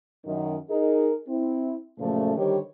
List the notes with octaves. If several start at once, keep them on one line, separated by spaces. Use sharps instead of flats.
F#2 D#3
D#4 G#4 A#4
C4 E4
F#2 A#2 C#3 F3 A3
D3 D#3 G3 G4 C5 C#5